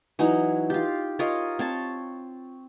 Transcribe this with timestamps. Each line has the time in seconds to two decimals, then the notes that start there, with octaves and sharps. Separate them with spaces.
0.19 E3 F#3 D#4
0.70 F4 G4
1.19 F4 A#4 C#5 D#5
1.59 C4 C#5 A5